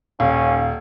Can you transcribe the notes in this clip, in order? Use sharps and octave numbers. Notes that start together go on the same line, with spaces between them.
D#1 C#4 F5